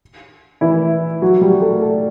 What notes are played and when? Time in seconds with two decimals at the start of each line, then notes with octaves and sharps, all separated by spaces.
0.61 E3 E4
1.22 F#3 F#4
1.41 G3 G4
1.62 A3 A4
1.81 A3 A4